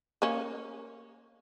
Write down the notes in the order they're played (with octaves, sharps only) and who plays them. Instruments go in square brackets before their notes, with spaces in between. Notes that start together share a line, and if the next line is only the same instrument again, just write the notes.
[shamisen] A#3 C#4